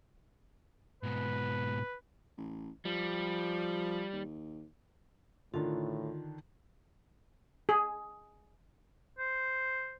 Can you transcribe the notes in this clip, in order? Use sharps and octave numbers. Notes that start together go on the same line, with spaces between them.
G#2 B2 B4
A1
F3 G3
D#2
A2 D3 D#3 D4 F4
G#4
C5